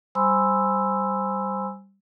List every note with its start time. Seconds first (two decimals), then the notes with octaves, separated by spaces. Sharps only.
0.15 G3 C5 G#5 B5 C6 E6